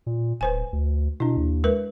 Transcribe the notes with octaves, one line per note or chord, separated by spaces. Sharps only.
A#2
D1 B4 C5 G#5
D2
B2 D4 E4
D#2
G#3 A#4 B4